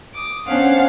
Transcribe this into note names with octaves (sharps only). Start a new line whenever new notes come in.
D6 D#6
B3 C#4 D4 C5 F5 F#5